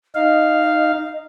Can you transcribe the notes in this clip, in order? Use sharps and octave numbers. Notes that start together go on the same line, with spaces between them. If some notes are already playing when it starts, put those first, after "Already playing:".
D#4 D#5 F5